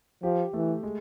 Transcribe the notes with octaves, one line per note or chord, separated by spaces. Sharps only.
F3 G4
E3 A3
G#3